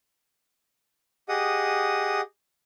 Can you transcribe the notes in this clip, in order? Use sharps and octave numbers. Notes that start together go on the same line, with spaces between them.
G4 G#4 D#5 F#5 D#6